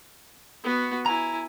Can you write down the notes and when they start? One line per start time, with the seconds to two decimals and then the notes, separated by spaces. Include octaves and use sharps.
0.63 B3 F#4
1.06 E4 G#5 A#5